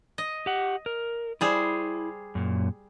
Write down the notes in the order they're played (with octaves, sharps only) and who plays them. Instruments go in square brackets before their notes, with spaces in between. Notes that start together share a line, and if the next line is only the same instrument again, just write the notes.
[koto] D#5
[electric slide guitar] G4 F#5
A#4
[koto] G3 G#4 C5 [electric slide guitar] E4
[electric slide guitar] F#2 A#2